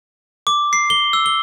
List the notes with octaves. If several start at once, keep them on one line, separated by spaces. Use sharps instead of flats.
D6
C7
G7
E6
G7